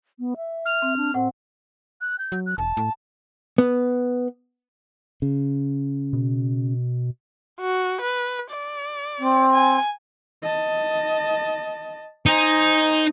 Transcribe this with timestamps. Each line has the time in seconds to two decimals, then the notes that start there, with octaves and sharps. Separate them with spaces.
0.19 B3
0.37 E5
0.65 F6
0.82 C4
0.97 D4
1.14 A2 C4 F#5
2.01 F#6
2.19 G6
2.32 F#3
2.46 F#6
2.58 E1 A5
2.77 A2
3.58 B3
5.22 C#3
6.13 B2
7.60 F#4
8.01 B4
8.52 D5
9.19 C4
9.52 G#5
10.42 D#5 A5
12.26 D#4 C5 G#5